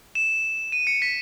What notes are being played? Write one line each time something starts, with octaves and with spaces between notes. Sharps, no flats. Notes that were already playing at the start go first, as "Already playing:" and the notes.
E7
D#7
C#7
B6